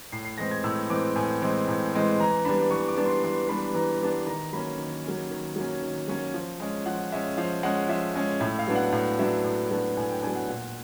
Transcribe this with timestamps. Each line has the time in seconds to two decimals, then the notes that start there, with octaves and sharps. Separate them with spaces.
0.12 A2 C7
0.25 C7
0.38 E3 G#3 C4 A#6
0.51 G#6
0.64 A2 E6
0.90 E3 G#3 C4 D6
1.15 A2 G#5
1.42 E3 G#3 C4
1.68 A2
1.94 E3 G#3 C4
2.20 E3 A#5
2.45 G3 B3 D4 B5
2.71 E3 C#6
2.88 D6
2.97 G3 B3 D4
3.05 C6
3.24 E3 C6
3.49 G3 B3 D4 B5
3.74 E3 A#5
4.01 G3 B3 D4
4.26 D#3 A#5
4.53 F#3 A#3 C#4 B5
4.78 D#3
5.04 F#3 A#3 C#4
5.30 D#3
5.56 F#3 A#3 C#4
5.82 D#3
6.08 F#3 A#3 C#4
6.34 F3
6.60 G#3 C#4
6.86 F3 F#5
7.12 G#3 C#4 E5
7.37 F3 F5
7.63 G#3 C#4 F#5
7.89 F3 E5
8.15 G#3 C#4
8.40 A2 E5
8.59 F5
8.68 F#3 B3 D4
8.76 F#5
8.92 A2 F5
9.19 F#3 B3 D4 E5
9.44 A2
9.71 F#3 B3 D4
9.97 A2 G#5
10.09 G5
10.22 F#3 B3 D4 G#5
10.35 F#5
10.49 A#2